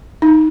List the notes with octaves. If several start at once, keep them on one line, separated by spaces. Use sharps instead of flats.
D#4